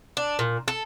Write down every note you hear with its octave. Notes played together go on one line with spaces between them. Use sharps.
D4
A#2
A4